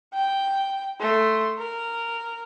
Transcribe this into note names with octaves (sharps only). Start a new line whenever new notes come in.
G5
A3 C6
A#4